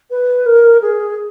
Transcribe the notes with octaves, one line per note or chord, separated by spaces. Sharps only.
B4
A#4
G#4